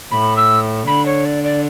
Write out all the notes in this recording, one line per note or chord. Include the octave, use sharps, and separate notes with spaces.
A2 B5
E6
D3 B5
C#5
D5
D5